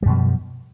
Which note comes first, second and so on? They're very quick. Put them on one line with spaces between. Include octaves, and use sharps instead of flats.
G3 F#2 B2 F3